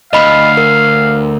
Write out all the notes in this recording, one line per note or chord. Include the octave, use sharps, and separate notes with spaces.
D2 D#5 F5 B5
A#4